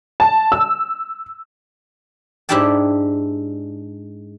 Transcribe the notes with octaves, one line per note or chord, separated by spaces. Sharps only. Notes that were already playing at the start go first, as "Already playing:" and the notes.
A5
E6
G#2 D4 E4 G4 G5 A5